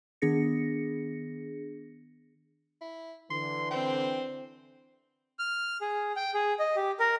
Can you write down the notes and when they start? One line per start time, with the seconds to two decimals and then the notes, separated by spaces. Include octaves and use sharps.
0.22 D#3 B3 D4 G#4 A#6 C#7
2.81 E4
3.31 D3 E3 C6
3.71 C4 G5
5.39 F6
5.81 G#4
6.16 G5
6.34 G#4
6.59 D#5
6.76 G4
7.00 A#4